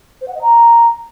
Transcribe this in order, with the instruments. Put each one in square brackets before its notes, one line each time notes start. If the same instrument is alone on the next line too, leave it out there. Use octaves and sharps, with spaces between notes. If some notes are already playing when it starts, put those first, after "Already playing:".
[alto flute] C5
F#5
D#5
A#5